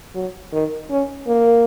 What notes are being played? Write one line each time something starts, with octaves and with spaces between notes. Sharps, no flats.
F#3
D#3
C#4
A#3